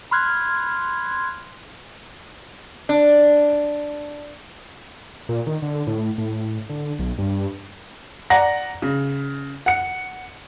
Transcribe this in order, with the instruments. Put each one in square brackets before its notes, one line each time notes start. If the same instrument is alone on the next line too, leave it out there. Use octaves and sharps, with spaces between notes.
[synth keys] B5 C6 F6 F#6 G#6
[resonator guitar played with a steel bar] D4
[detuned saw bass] A#2
D#3
D3
A2
A2
D3
B1
G2
[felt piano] D5 F#5 A#5 A#6
C#3
F#5 C#7